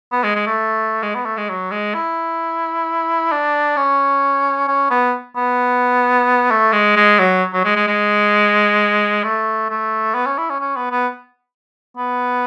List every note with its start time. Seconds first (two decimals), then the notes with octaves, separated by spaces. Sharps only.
0.12 B3
0.23 G#3
0.35 G#3
0.46 A3
1.03 G#3
1.15 B3
1.25 A3
1.37 G#3
1.49 F#3
1.71 G#3
1.94 E4
3.32 D4
3.77 C#4
4.68 C#4
4.90 B3
5.36 B3
6.51 A3
6.73 G#3
6.96 G#3
7.19 F#3
7.53 F#3
7.65 G#3
7.76 G#3
7.87 G#3
9.24 A3
9.70 A3
10.14 B3
10.26 C#4
10.38 E4
10.50 C#4
10.60 C#4
10.76 B3
10.91 B3
11.97 B3